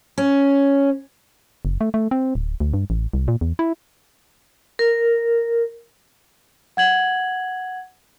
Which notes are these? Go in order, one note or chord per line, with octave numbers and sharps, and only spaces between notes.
C#4
F#1
A3
A3
C4
D1
D2
G2
A1
C2
A#2
E2
E4
A#4
F#5 G#6 F#7